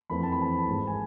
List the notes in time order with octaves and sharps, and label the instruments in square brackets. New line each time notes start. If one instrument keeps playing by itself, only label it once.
[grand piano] F2 E3 A3 C4 B5
A5
B5
A5
G#1 G#2 G#3
G#5